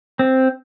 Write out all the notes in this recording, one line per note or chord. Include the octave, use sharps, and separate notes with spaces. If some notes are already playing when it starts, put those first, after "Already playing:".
C4